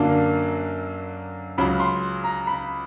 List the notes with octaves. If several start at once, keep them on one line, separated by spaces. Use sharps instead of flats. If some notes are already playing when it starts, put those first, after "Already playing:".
Already playing: F#2 D3 F#3 A#3 D4
C#2 C#3 F#3 B5
C6
A#5
B5